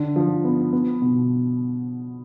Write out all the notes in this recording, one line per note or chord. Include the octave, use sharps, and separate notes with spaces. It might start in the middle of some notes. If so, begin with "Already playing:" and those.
Already playing: D3
F3
B3
B3
B2